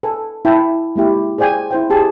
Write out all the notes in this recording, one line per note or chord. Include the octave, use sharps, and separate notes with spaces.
A4 B4 G#5
E4 B4 G5 A5
G#3 A#3 E4 G4
G#4 C5 D5 G5 G#5
E4 C5 G5
G4 G#4 A5